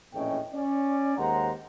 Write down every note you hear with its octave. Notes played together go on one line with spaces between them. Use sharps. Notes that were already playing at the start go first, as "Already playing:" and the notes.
A#1 E2 A2 C#4 D#5 G5
C#4 D5
D#2 G#3 C5 F#5 A#5